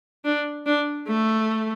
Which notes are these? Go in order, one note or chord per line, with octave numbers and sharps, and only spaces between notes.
D4
D4
A3